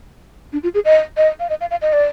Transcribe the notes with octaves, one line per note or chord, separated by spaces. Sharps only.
D4
F4
G#4
D#5
D#5
F5
D#5
F5
F5
D#5
D5